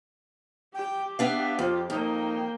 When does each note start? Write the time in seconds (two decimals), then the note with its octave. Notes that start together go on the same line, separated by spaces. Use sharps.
0.75 G4 G5
1.19 B3 D4 E5 F5
1.59 F2 F4
1.90 F2 A#3 D#4 G5